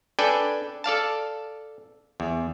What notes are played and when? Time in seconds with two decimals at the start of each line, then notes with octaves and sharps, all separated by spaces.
0.19 D4 A4 B4 D5 G5 G#5
0.84 A4 D5 F5 A5
2.20 E2